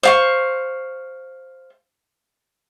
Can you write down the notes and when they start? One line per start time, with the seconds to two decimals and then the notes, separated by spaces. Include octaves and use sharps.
0.03 C5 F5 C#6